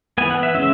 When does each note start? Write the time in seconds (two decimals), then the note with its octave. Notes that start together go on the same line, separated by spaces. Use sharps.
0.18 E3 B3 G#5
0.31 F#5
0.43 E5
0.54 C#3 G#3 C#4 E5